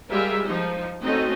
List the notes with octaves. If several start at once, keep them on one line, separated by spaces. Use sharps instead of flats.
G3 G#3 F4 G#4 A#4 E5
F3 D#4
A3 C4 C#4 D#4 F#4 D#5